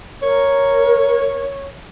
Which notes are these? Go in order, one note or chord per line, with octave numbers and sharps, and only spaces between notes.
A#4 C#5